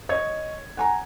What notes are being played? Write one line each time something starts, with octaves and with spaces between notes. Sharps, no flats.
C#5 D#5 G#6
F#5 G#5 A#5